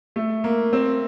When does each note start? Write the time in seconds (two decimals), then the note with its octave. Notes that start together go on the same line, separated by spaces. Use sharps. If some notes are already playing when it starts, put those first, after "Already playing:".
0.16 A3
0.44 A#3
0.73 C4